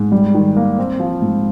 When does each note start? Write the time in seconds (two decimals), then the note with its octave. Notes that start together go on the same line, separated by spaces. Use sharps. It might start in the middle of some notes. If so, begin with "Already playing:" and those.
Already playing: G#2
0.12 G3
0.34 D#3
0.57 A#3
0.79 C4
1.00 F3
1.22 G#2